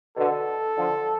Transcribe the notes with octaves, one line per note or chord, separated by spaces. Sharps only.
B2 D3 A4
D3 F3